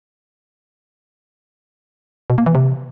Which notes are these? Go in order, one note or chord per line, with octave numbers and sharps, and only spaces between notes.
B2
A#3
E3
C3